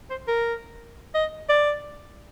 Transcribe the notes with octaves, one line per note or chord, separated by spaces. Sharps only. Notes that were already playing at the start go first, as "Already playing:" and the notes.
C5
A#4
D#5
D5